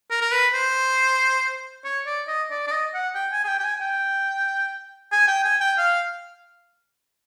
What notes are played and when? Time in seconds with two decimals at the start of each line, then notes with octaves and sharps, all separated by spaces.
0.10 A#4
0.21 A#4
0.31 B4
0.54 C5
1.84 C#5
2.06 D5
2.27 D#5
2.50 D5
2.67 D5
2.71 D#5
2.94 F#5
3.15 G5
3.32 G#5
3.44 G#5
3.48 G5
3.59 G5
3.64 G#5
3.81 G5
5.12 G#5
5.28 G5
5.44 G#5
5.60 G5
5.78 F5